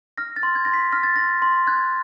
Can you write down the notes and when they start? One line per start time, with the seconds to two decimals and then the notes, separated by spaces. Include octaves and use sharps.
0.18 F6 A#6
0.36 A6
0.43 C6
0.55 G#6
0.65 C6 A#6
0.74 B6
0.92 F6 A#6
1.03 A6
1.16 C6 A#6
1.42 C6
1.67 F#6 G#6